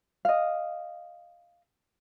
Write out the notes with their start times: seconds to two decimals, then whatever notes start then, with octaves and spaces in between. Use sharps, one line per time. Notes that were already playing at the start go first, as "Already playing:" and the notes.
0.25 D#5 F5